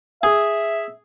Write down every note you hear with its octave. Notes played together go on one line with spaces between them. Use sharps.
G#4 E5